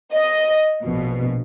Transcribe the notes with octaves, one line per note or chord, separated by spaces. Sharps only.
D#5
A#1 B2